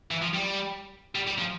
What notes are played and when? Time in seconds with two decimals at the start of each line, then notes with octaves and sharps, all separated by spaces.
0.11 E3
0.22 F3
0.34 G3
1.15 G3
1.27 G3
1.39 F3